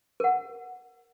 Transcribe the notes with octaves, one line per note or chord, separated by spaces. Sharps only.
A#4 F#5